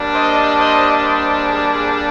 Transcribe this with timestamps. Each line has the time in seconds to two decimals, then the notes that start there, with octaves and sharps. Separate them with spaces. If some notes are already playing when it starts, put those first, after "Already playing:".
Already playing: G3 A#3 D4
0.14 C5 D#5
0.58 C5 D#5
1.01 C5 D#5
1.44 G#4
1.73 G#4 C5